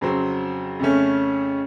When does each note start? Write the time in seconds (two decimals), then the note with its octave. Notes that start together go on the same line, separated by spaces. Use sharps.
0.01 F2 C#3 F#3 C4
0.79 F2 C#3 A3 C#4